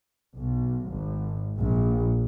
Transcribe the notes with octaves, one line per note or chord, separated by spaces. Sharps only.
B1
G#1
A#1